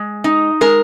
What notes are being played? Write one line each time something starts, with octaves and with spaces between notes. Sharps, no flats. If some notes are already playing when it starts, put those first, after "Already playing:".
Already playing: G#3
D#4
G#3 A#4